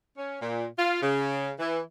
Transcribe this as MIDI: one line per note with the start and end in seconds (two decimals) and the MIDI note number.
0.18 0.38 61
0.41 0.65 46
0.79 1.01 65
1.02 1.51 49
1.59 1.80 52